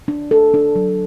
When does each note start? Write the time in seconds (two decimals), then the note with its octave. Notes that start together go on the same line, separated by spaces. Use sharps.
0.08 D4
0.31 A4
0.54 D4
0.76 F#3